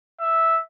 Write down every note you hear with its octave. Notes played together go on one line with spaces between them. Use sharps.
E5